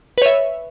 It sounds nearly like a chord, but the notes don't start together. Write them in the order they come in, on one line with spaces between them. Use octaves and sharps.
B4 C#5 E5